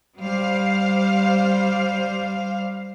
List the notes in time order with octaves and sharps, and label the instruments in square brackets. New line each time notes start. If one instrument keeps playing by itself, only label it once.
[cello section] G3 C5 F5